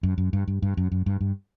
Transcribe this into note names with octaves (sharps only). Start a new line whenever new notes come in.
F#2
F#2
G2
G2
G2
F#2
F#2
G2
G2